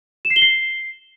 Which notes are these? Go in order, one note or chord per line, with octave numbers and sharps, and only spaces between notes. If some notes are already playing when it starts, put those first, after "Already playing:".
E7
C7
G7
C7